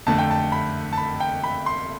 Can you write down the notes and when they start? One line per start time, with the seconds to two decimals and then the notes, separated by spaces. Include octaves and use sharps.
0.07 F2 D3 A3 A5
0.18 G5
0.30 A5
0.52 B5
0.93 A5
0.98 B5
1.20 G5
1.44 B5
1.66 C6